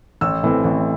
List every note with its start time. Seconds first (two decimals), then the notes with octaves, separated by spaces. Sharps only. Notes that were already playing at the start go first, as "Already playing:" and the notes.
0.21 A1 E6
0.43 A2 E3 A3 C4
0.64 A1